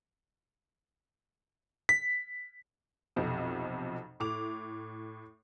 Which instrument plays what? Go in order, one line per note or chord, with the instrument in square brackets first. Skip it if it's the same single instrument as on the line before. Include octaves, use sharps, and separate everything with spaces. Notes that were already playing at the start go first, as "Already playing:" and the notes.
[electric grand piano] B6
[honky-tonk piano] B1 F2 C3
A2 D6 F7